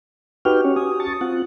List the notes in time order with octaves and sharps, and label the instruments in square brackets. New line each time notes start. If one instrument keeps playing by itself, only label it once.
[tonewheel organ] D#4 G5 F6 [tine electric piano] F#4 G4 [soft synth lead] B4
[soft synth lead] C#4 [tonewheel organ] C#5
[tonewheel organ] G#5 [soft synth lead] D#6
[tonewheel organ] A5 C#6 A6
C4 F4 F#5